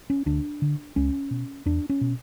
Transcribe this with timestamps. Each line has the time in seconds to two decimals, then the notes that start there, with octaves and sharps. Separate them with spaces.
0.10 C#4
0.26 D2 D4
0.62 D3
0.96 C#2 C#4
1.31 B2
1.66 E2 D4
1.89 C#4
2.01 B2